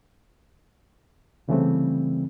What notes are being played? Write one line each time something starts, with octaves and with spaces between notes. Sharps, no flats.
C2 C#3 E3 G3 A3 C4